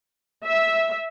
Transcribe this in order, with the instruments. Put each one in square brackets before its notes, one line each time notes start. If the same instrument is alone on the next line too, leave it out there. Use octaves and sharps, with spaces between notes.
[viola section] E5